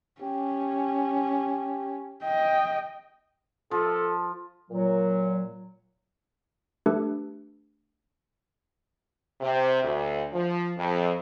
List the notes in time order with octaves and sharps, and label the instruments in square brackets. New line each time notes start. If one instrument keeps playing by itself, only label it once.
[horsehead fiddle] C#4 [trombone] G4
[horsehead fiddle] D#5 G5
[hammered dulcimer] F3 [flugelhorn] A4
[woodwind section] A#2 F#3
[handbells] A3 D4 G4 A4 B4
[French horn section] C3
D2
F3
F2